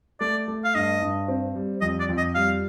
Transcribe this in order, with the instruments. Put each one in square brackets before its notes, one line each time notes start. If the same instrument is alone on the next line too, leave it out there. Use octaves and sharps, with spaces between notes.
[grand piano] A3 [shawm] D5
[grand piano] A3
[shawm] F5
[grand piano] G2 [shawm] D#5
[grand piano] G2
C4
G3
[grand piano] F2 [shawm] D#5
[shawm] D5
[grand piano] F2
[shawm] D#5
[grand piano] G3 [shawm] F5